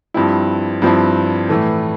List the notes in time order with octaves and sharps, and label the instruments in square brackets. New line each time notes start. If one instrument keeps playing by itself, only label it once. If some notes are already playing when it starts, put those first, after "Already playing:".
[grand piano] G2 F3 C4 E4
G2 F3 C4 E4
A2 E3 A3